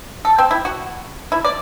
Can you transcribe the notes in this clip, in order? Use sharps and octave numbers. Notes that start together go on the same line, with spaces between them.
A4
C4
E4
F#4
E4
D5